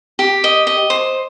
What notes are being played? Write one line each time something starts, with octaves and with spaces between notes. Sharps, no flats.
G4
D#5
D#5
C5